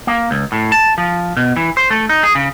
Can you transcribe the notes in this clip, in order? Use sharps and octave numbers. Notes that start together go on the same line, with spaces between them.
A#3
C#2
A2
A5
F3
B2
E3
C5
A3
D#4
G#4
C#3